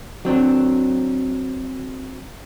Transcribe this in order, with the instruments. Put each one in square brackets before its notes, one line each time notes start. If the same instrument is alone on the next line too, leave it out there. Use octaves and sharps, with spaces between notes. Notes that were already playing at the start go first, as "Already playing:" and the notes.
[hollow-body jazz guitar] F#3 C4 D4